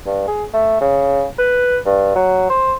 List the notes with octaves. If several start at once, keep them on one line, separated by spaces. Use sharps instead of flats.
G2
G#4
A3
C#3
B4
G2
F#3
C5